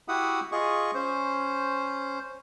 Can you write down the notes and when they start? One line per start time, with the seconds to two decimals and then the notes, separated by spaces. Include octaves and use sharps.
0.08 E4 F#4 G4 E5 F#5 D#6
0.52 F4 G#4 D#5 C#6
0.94 C#4 C5